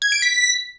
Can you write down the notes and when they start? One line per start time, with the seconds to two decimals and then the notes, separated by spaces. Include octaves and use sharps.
0.02 G#6
0.12 D7
0.22 B6